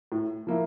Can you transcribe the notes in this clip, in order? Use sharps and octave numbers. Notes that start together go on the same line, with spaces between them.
A2
F3 A#3 E4